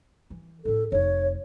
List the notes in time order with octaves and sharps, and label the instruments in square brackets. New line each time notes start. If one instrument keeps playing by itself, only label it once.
[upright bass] E3
[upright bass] A2 C4 [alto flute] A4
[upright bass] F1 D#4 [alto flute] C#5